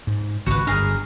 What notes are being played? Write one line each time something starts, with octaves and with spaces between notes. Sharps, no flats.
G#2
G#1 C#2 F#4 B4
G1 D4 G#4 A#4